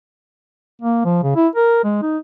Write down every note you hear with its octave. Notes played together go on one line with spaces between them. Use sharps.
A#3
F3
C#3
E4
A#4
G#3
D#4